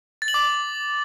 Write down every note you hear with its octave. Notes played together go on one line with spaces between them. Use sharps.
A6
F#7
D6